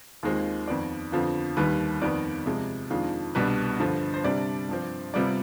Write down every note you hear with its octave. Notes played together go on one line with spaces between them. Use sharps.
D#2 D#3 G#3 C4 F4
F2 D#3 B3 D5
F2 D3 F3 B3 F4
D#2 D#3 G3 B4
F2 D#3 B3 D5
C3 F3 G#3
F2 D#3 G#3 D4 F4
C2 B2 G3 D4 B4
G2 D3 F3
C5
C3 G3 D4 D5
G2 F3 C4
C3 G3 B3 F4 D5